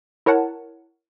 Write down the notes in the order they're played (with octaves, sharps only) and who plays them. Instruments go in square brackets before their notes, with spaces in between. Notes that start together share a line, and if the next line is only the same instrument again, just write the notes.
[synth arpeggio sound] E4 A#4 C#5 F#5 A5